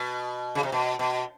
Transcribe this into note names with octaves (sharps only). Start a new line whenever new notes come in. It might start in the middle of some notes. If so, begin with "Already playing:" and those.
Already playing: B2
C#3
C3
B2
B2